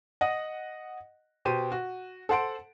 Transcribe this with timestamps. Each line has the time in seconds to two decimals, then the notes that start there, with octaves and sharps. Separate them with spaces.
0.21 D#5 F#5
1.45 B2 G4 C5 D#7
1.72 F#4
2.29 A4 C5 F#5 C6 D7